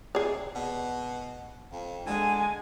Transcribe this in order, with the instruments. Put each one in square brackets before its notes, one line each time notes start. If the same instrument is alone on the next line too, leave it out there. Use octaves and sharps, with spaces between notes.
[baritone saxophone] C3 [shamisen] G#4 D5
[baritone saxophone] B2
F2
[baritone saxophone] D3 [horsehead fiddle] G#3 G#5